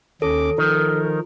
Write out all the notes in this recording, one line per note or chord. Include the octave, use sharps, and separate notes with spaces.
D#2 C#4 A4 D6
D#3 F3 A#4